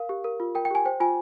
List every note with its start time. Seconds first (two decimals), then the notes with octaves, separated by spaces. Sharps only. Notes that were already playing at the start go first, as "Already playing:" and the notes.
Already playing: A#4 F5
0.09 G4
0.24 A#4
0.40 F4
0.55 A#4 G5
0.65 G5
0.71 G4 G#5
0.85 C5 G5
1.00 F4 G#5